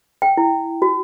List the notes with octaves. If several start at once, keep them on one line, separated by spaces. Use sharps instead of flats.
G5
E4
F#4